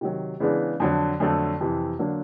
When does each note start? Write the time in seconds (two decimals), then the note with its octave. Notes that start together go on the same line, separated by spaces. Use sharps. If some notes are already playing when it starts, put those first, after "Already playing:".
0.01 C3 D#3 F#3
0.40 C#3 E3 G#3 B3 D4
0.80 F2 D3 F#3
1.20 F2 D3 F#3 A3
1.60 F2 C3 E3
1.99 D3 F#3 A#3 D4